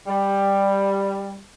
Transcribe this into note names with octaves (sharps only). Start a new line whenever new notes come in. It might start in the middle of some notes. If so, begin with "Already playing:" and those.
G3